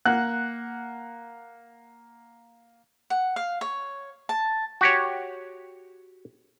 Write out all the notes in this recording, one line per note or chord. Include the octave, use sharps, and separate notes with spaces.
A#3 F#5 F#6
F#5
F5
C#5
A5
F#4 G4 C#5